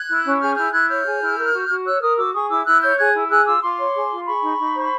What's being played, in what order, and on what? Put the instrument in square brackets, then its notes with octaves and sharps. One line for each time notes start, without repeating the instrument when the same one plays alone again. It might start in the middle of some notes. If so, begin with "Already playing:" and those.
Already playing: [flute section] F#6 G#6
E4
C#4
G#4 F6 G6
E4 F6 G6
E4 F#6 G#6
C#5 F6 G6
G#4
E4
A#4
F#4
F#4
C#5 E6 F#6
A#4 D#6 F6
F#4 D6 E6
G#4 C#6 D#6
E4 D6 E6
E4 E6 F#6
C#5 F6 G6
G#4 F#6 G#6
E4
G#4 E6 F#6
F4 D6 E6
F4 C6 D6
C#5
G#4
F4
G#4 B5 C#6
D#4
D#4
C5